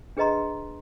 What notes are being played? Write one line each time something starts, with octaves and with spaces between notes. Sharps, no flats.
D4 G#4 B4 D#5 A#5 C6